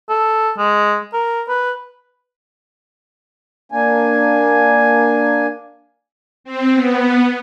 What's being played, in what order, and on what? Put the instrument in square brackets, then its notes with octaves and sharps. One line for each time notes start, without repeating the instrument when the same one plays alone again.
[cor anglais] A4
G#3
A#4
B4
[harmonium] A#3 D4 G#5
[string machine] C4
B3